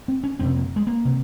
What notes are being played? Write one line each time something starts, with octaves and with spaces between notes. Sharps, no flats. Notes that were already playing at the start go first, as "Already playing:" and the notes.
C4
C#4
F2 C3 C4
A#3
G#3
A#3
C3